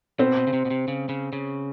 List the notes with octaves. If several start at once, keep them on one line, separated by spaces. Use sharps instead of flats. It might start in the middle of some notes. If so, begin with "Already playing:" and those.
B2 C4
B2
C#3
C3
B2
C3
C#3
C#3
C#3